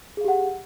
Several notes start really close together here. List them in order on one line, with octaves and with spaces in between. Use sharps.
G#4 F5 G4 F#5